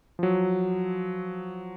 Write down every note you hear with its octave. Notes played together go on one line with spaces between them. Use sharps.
F3 F#3